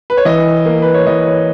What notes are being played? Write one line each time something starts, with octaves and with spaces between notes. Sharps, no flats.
B4
C#5
E3 D#5
A#3
B4
C#5
E3 D#5
C#5